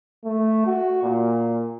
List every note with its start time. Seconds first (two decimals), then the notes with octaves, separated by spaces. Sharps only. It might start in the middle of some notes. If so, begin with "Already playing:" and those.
0.24 A3
0.66 F#4
1.03 A#2